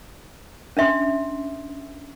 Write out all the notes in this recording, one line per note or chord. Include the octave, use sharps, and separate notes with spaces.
C#4 D4 E5 C6